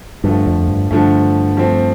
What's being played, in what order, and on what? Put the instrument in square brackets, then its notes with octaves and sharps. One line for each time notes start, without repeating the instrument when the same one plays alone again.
[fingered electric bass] G2 [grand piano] D3 F3 A3
[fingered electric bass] F2
G2
[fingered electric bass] G2 [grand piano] D3 F3 A3
[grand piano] F3 A3 C4